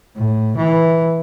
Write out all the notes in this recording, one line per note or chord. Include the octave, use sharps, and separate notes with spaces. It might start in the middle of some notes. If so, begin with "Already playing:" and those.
A2
E3